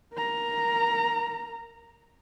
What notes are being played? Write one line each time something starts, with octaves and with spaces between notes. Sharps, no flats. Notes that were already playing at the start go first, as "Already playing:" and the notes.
A#4 A#5